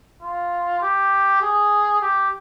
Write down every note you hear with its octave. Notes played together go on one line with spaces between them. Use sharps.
F4
G4
G#4
G4